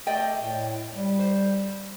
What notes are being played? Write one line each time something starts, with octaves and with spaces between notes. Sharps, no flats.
A3 D5 D#5 G5
A2
G3
C5